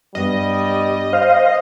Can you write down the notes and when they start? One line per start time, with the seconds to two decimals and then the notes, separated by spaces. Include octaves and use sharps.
0.15 G2 G3 B3 D#5
1.13 C5 F5